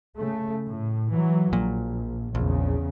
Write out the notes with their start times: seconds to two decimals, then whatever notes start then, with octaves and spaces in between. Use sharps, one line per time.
0.15 C#3 A3
0.67 A2
1.12 E3 F#3
1.53 A#1 A#2
2.35 A#1 E2 C#3